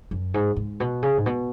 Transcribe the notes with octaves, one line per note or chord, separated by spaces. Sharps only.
F#2
G#2
G#2
B2
C#3
G#2
B2